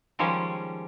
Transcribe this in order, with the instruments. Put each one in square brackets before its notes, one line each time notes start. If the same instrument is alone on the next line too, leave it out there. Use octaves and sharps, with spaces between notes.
[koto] D#3 F3 G3 G#3 C#4